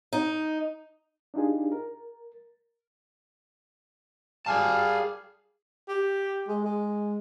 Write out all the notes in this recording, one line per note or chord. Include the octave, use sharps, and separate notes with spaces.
D#4
D4 D#4 F4 G4 G#4
A#4
G3 G#4 F5 G#5 A5
G4
G#3
G#3